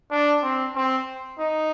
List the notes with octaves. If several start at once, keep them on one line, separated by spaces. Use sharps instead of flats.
D4
C4
C4
D#4